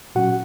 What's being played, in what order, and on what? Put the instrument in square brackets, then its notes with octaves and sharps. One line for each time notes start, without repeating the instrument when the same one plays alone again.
[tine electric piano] A#2 F#3 C#4 F#4 F#5